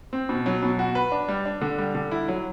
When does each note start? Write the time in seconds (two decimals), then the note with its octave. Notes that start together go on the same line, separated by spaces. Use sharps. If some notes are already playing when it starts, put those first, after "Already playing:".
0.13 C4
0.29 B2
0.46 F#3
0.63 B2
0.79 F#4
0.95 B4
1.12 D4
1.29 G3
1.46 D4
1.62 D3
1.78 G3
1.95 D3
2.11 E4
2.28 F#3